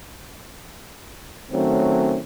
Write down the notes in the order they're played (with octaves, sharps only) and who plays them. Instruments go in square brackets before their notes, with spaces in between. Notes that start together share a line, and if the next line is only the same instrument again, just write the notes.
[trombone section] D#3 F#3 A3 C4 C#4